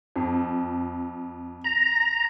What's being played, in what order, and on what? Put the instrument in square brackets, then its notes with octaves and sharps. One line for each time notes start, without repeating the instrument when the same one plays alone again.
[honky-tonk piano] F2
[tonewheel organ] A#5